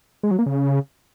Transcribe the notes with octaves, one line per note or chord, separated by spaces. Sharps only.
G#3
F#3
A#3
C#3